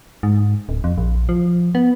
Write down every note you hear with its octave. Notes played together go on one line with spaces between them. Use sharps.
G#2
D1
F2
A#1
F3
B3